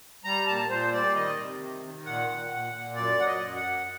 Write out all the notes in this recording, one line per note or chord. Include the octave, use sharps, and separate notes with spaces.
G3 A#5
A#2 A5
A#2 C5
G3 D5
D#3 D#5
C3
D#3
D#3
A#2 F#5
A#2
A#2
A#2
F#2 D5
F#3 F#5
D#5
F#2
F#5
F#2